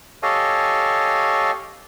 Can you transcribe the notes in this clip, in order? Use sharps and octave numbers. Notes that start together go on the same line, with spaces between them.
G4 A4 C#5 D#5 F5 G#5